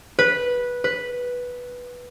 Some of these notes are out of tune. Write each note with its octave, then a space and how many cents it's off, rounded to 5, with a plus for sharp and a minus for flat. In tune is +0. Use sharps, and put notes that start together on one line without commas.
B4 -10
B4 -5